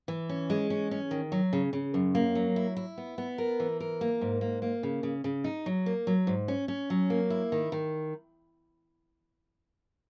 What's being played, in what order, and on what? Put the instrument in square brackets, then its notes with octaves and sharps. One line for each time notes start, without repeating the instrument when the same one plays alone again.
[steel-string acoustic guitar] E3
C#4
G#3
C#4
C#4
D#3
F#3
C#3
C#3
F#2
A#3
F#3
E4
E4
B3
B3
A#4
E3
A#4
A#3
G#2
A#3
A#3
C#3
C#3
C#3
D#4
F#3
A#3
F#3
G#2
C#4
C#4
F#3
A#3
E4
D#3
D#3